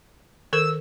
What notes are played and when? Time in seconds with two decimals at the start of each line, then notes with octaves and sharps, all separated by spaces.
0.53 D#3 A4 A#4 E6